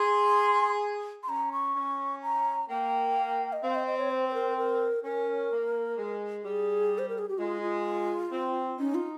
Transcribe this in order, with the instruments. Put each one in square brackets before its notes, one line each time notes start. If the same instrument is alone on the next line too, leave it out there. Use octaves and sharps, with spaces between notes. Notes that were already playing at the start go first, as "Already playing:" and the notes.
Already playing: [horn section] G#4 [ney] C6
[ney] C6
[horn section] C#4 [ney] A#5
[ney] C#6
[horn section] C#4
[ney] A#5
[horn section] A#3 [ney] G5
[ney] D#5
[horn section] C4 [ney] F5
[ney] D#5
D#5
C#5
C5
C5
A#4
A#4
[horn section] C#4 [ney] A#4
[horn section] A#3
G#3
[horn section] G3 [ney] G#4
[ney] C5
A#4
G#4
G4
[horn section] G#3 [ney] F4
[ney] F4
[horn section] C4
[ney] C#4 [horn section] D#4
[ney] F4